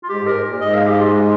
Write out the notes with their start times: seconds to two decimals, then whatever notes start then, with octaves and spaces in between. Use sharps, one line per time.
0.03 F4
0.08 G#2 G4
0.21 G#2
0.26 A#4
0.47 A#2
0.61 G#2 D#5
0.74 F5
0.87 G4
1.00 F4
1.13 G#3